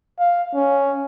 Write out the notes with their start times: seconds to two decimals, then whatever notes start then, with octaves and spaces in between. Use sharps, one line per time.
0.19 F5
0.54 C#4